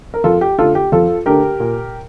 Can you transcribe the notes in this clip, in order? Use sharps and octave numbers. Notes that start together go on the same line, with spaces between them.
A#4
F2 F4 A4
G4
D3 A3 D4 F4 A4
G4
F2 F4 A4
D3 A3 D4 G4 A#4
A#2